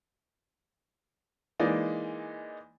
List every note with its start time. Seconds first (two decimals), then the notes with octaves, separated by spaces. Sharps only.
1.59 E3 G#3 A#3 D#4 D5